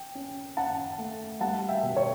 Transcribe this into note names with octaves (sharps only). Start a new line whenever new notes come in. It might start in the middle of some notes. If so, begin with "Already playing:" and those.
Already playing: G5
C#4
C#4 F#5 A5
A3
G3 F#5 A5
E5 G5
B2
C#5